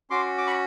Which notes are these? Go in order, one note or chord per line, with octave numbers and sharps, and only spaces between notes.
C#4 F#4 C6 D6
D6
B5 C#6